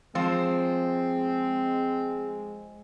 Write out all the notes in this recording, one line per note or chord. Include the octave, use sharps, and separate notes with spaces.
F3 G#3 C4 C5